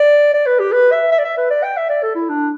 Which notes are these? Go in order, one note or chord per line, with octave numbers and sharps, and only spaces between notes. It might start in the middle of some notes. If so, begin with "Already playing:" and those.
Already playing: D5
D5
B4
G4
B4
E5
E5
D5
E5
B4
D5
G5
E5
D5
A4
E4
D4